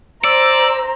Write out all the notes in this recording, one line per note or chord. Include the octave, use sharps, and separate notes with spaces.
C5 D5 A#5 E6